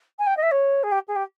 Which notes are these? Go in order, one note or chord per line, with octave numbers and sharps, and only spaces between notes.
G#5
G5
D#5
E5
C#5
G#4
G4
G#4
G4